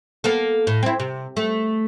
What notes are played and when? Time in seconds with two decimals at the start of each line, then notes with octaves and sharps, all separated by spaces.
0.24 A#3 B3 A4
0.67 A2
0.83 C4 E4
1.00 C3
1.37 A3